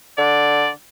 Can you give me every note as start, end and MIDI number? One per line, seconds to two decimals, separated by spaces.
0.18 0.69 50
0.18 0.71 74